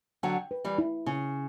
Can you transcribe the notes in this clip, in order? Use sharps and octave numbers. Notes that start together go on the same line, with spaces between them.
D3 F#3 G5
B4
E3 G3
E4
C#3 E4